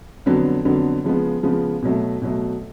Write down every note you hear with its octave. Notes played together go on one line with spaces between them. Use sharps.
F2 D3 F#3 B3
F2 D3 F#3 B3
C#3 F3 G#3 B3
C#3 F3 G#3 B3
B2 F#3 A3
B2 F#3 A3